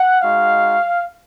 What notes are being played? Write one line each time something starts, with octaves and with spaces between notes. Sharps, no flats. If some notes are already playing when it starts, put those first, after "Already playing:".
Already playing: F#5
G#3 D#4 F#4 F5